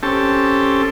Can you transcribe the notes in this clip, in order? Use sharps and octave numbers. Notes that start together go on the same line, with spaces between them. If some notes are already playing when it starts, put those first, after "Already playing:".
C4 C#4 G4 A4 A5